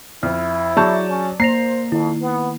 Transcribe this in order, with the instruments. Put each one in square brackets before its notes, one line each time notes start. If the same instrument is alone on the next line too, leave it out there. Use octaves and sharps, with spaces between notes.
[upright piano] F2 [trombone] E4 [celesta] F6
[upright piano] F#3 A5 C#6 [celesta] G#4 G6 [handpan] D5
[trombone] C#4
[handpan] A#3 [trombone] C5 [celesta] A#5 A#6 F7 [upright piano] C7
[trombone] F2 [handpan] D#3 [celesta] E4
[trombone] B3